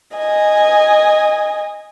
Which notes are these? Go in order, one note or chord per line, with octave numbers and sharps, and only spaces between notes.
D#5 G#5